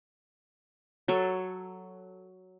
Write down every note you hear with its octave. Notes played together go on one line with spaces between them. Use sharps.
F#3 A4 C#5